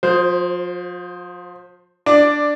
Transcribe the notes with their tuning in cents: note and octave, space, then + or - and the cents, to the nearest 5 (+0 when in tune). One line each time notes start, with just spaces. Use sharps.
F3 +35 C5 +0
D4 +0 D5 +10